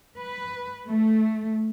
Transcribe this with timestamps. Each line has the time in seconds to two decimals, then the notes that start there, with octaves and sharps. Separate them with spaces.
0.16 B4
0.86 A3